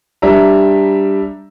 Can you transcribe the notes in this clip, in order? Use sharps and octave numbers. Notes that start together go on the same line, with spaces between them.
G3 D4 E5 A#5